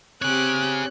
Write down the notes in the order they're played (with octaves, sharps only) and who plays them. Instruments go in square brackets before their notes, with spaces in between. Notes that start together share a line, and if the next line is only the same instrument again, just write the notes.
[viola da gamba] C4 G4 [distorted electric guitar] G#4 C#5 [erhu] F#6